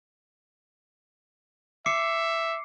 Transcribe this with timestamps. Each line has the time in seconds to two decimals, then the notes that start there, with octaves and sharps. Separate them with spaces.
1.86 E5 D6 C7 C#7